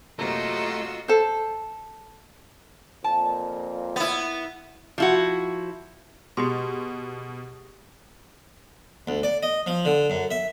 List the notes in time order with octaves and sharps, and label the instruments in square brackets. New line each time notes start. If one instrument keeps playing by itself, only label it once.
[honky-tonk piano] F#2 C3 A#3 [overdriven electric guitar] A3 [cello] F4 D#5 [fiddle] F#4 E6
[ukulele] A4 C5
[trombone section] F2 A#2 [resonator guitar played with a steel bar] A5
[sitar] B3 E4
[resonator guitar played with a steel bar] F3 E4 F#4
[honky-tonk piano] B2 [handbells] G4 G#4 C6
[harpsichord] D2
D5
D#5
F3
D3
F#2
E5